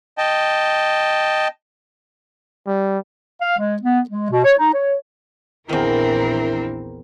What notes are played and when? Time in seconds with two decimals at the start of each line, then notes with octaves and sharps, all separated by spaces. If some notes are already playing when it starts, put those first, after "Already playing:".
0.18 D#5 G5 A5
2.67 G3
3.42 F5
3.58 G#3
3.82 B3
4.10 G#3
4.31 B2
4.44 C#5
4.58 D#4
4.74 C#5
5.69 A#1 E2 D#3 E3 C4 D4 E4 A#4